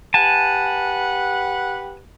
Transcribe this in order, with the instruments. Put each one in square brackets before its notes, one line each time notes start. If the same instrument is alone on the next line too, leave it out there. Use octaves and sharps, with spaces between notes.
[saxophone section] G4 B4 F#5 [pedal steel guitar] G#5 A5